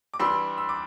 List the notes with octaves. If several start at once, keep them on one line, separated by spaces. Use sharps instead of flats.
D6
E3 G3 D4 C6 E6
E6
D6